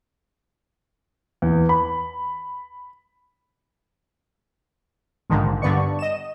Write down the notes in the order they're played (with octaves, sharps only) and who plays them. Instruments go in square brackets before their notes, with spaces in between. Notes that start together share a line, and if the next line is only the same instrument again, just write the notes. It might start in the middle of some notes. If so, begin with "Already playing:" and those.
[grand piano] E2
B5
[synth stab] A#1 G#2 D3 D#3 F3
G2 D3 B3 D5 C#6
D#5 E7